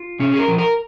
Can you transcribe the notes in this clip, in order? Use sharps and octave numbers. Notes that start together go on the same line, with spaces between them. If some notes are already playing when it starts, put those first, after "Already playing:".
Already playing: F4
C3 C#4
G#4
A#4
F3
A#4